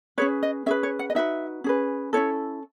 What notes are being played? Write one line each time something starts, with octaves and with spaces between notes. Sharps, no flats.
C#4 G#4 B4 C#5
D#5
C#4 G#4 B4 E5
C#5
F#5
D#5
D#4 F#4 B4 E5
C#4 G#4 B4
C#4 E4 A4 C#5